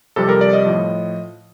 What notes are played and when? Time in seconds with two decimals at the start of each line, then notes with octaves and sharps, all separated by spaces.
0.16 F2 C3 G3 A4
0.29 A#4
0.41 D5
0.53 D#5
0.66 A2 F3